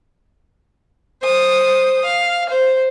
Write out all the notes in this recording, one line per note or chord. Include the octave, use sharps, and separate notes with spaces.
C5 D#6
F5
C5